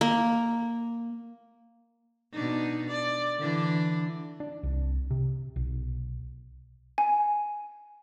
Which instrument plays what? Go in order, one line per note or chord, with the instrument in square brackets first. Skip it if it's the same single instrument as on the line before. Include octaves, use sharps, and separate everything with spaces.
[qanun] A#3
[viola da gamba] B2 D4 D#4
D5
D3 E3 D4
[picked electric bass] D4
C2
C3
B1
[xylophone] G#5